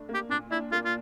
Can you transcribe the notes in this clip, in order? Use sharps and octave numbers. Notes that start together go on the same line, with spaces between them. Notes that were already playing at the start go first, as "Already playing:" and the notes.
Already playing: A2 D4
A#3
G4
A#2 D4
D4 E4
A#3 F4
F4